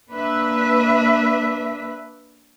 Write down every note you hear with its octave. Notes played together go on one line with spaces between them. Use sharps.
A#3 D4 B4 E5